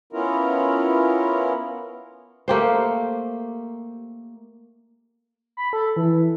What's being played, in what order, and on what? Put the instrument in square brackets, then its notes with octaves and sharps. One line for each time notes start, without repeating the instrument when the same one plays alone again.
[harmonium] B3 C#4 E4 F4 A#4
[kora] A3 A#3 G4 C5
[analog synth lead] B5
A4
E3